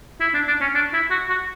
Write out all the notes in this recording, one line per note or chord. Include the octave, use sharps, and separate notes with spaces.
E4
D4
D4
C#4
D4
E4
F#4
F#4